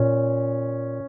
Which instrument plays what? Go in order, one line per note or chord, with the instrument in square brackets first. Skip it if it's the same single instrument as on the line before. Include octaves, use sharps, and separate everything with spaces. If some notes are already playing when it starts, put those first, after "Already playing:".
Already playing: [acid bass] A#2 [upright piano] C#4